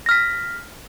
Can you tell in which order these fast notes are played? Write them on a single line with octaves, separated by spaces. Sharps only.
A#6 F6 B6